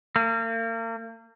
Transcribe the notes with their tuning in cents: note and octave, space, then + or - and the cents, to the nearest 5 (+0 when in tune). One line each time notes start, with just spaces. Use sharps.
A#3 -40